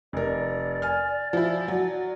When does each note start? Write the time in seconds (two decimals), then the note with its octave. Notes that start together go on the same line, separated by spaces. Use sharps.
0.13 F1 A#4 D5
0.82 G#5 F6
1.33 F3 E4
1.68 F#3